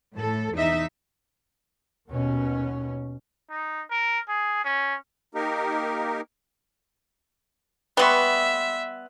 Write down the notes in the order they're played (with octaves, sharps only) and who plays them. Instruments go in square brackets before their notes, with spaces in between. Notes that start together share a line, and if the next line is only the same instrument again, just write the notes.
[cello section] A2 A4
E2 D#4 E5
[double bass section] D#2 B2 C#4
[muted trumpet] D#4
A#4
G#4
C#4
[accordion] A#3 D#4 G4 A#4
[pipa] G3 B3 [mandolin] B4 C6 C#6 [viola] E5